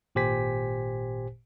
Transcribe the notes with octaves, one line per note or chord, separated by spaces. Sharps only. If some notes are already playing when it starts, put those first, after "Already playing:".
G#1 A#2 G4 C5 G#5 B6